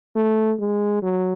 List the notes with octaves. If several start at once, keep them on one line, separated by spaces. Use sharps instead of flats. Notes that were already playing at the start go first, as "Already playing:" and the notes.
A3
G#3
F#3